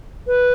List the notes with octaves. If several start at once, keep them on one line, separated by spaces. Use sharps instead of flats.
B4